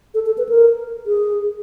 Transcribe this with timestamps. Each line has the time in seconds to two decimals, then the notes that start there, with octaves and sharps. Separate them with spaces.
0.14 A4
0.26 A4
0.38 B4
0.49 A#4
1.06 G#4